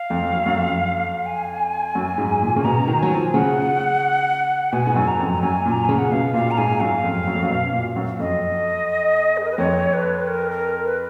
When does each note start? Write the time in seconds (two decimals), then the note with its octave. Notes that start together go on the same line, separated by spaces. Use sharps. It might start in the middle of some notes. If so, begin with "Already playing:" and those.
Already playing: F5
0.10 F2
0.22 F2
0.33 F#2
0.46 F#2
0.57 F2
1.26 G#5
1.95 F#2
2.18 G#2
2.42 A#2
2.56 C#3
2.64 B2 A#5
2.87 D#3
2.99 F#3 G#5
3.11 F3
3.34 C#3 F#5
4.73 B2 G#5
4.87 G#2
4.96 F#2
5.08 A#5
5.19 F2
5.32 A#5
5.42 F#2 G#5
5.66 A#2
5.72 A#5
5.85 C#3 G#5
5.98 F#5
6.11 B2 F5
6.34 A#2 F5
6.51 A#5
6.58 G#2 G#5
6.80 F#2 F5
7.04 F2
7.27 F#2
7.35 F2
7.42 F#2
7.51 B2
7.73 A#2
7.96 F#2
8.20 F2 D#5
9.37 G#4
9.45 A#4
9.51 B4
9.58 F2 C#5
9.93 B4
10.28 A#4
10.51 A#4
10.85 B4